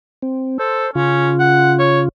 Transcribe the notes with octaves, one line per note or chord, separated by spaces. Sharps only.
C4
A4 C5
C#3 C#4 F4
F#5
C#5